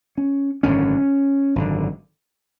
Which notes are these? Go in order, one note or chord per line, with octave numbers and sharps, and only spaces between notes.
C#4
G#1 F#2 D3 C#4
G#1 F#2 D3